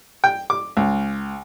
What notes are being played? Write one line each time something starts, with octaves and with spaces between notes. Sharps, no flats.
G5
D6
C#2